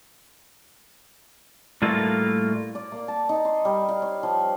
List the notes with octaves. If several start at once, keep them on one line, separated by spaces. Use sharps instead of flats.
A2 G3 A#3 F4 F#4 A4
D5
A#3
A5
D#4
C6
G3
F5
C#5
F3